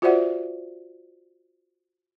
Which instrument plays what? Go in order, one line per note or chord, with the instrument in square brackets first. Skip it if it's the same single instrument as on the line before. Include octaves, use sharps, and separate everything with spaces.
[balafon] F4 F#4 C5 D5 E5 F#5